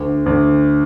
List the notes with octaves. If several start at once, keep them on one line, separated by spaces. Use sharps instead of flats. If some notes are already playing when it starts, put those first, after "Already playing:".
Already playing: D2
D2